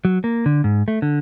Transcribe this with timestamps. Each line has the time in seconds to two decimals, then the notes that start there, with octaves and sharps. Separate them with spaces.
0.05 F#3
0.24 A#3
0.46 D3
0.64 G#2
0.88 A3
1.02 D3